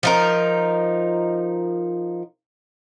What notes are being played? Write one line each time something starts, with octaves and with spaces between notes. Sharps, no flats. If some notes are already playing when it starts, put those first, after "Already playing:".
F3 D#4 A#4